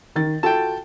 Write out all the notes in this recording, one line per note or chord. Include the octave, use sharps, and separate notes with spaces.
D#3 A6
F4 F#4 A4 G5 A5